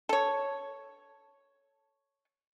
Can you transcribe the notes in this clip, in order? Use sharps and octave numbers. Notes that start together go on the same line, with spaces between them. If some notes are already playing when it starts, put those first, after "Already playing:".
A4 C#5